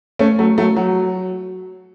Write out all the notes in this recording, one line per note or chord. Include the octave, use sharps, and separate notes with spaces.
A3 C#4
F#3 A3
F#3 A3
F#3